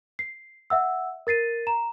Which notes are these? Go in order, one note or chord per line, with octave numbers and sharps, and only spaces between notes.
C7
E5 F#5 E6
A#4 A6 C7 D#7
A#5 E7